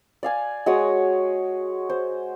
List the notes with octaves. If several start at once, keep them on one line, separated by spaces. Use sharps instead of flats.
D5 F5 G#5
G#3 F#4 C#5 D#6
C5